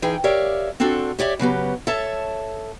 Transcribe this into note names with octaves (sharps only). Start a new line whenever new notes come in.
E3 D#4 G#4 G5
G4 A#4 C#5 D5 E5 F5
C4 D4 F4 F#4 A4
G4 C#5 D5 E5
C#3 F#3 B3 G4
A4 C#5 E5 A5